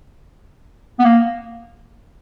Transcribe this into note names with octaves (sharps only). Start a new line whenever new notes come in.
B3
A#3